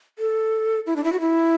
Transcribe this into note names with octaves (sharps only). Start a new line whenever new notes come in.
A4
E4
D4
E4
F#4
E4